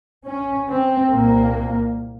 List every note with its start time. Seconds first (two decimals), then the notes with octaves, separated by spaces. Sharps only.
0.25 C#4
0.69 C4
1.12 C2 A#2 A#3